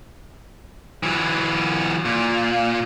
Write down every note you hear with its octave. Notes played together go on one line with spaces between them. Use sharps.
E3 F#3
A#2